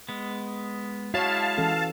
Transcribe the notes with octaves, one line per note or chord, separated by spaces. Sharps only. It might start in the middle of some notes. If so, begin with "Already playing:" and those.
G#3 B3
G#3 E4 F#4 C#5 F5 A5
E3 C#4 A4